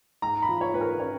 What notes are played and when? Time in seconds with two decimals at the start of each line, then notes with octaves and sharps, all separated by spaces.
0.22 G#2 A#5
0.43 B5
0.49 F3
0.61 C#5
0.74 G#2 B4
0.81 A#4
1.00 C#4 C#5